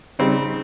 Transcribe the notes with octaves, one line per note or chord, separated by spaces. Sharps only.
C#3 G3 C4 D#4